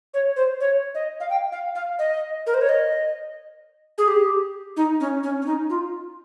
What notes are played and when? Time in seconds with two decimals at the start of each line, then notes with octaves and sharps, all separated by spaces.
0.14 C#5
0.36 C5
0.60 C#5
0.95 D#5
1.20 F5
1.30 G5
1.52 F5
1.75 F5
1.99 D#5
2.47 A#4
2.54 C5
2.61 C#5
2.69 D#5
3.98 G#4
4.08 G4
4.77 D#4
5.00 C#4
5.23 C#4
5.42 C#4
5.46 D#4
5.70 F4